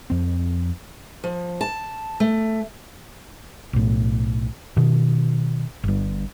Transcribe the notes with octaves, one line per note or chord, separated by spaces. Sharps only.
F2 C4
F3
A5
A3
B1 A2
B2 D#3
G1 G2